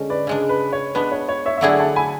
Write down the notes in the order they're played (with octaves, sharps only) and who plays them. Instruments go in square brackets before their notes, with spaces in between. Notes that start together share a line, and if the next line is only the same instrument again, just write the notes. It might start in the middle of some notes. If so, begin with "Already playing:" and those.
Already playing: [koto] D3 G#3 C#4
[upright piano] B4 D5
[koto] C#3 G#3 D4
[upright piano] B4
C#5
[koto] G#3 B3 D4 [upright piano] B4
[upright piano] C#5
C#5
C#5 E5
E5
[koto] D3 F#3 A3 E4 G#4 [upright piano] D5 F#5
[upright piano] F#5 A5
G#5 B5